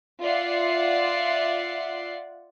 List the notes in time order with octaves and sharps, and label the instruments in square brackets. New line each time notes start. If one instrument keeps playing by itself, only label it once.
[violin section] F4 D5 E5 F#5 C7